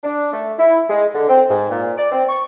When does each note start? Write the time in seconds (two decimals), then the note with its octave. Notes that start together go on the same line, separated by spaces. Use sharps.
0.04 D4
0.32 A3
0.59 E4
0.89 G#3
1.14 D3
1.29 C4
1.49 G#2
1.70 A#2
1.97 D5
2.12 C4
2.29 C#6